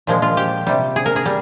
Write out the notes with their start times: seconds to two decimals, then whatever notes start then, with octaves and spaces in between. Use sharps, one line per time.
0.07 A#2 F3 G#3
0.22 F4
0.37 G4
0.67 C3 G3
0.96 G#4
1.06 A#4
1.16 G#4
1.26 G3